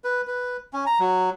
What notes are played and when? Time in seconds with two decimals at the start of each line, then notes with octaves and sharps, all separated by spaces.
0.04 B4
0.27 B4
0.73 C#4
0.86 A#5
0.99 F#3